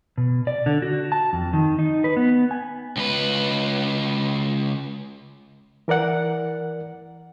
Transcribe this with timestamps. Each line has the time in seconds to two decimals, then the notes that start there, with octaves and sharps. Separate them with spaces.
0.18 B2
0.47 D5
0.66 D3
0.82 F#4
1.12 A5
1.33 F2
1.53 D#3
1.79 D#4
2.04 B4
2.17 B3
2.51 G#5
2.97 C#2 B4
5.88 E3 A#4 D5 F#5